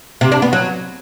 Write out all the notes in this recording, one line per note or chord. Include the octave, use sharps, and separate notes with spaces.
C3
D4
B3
F#3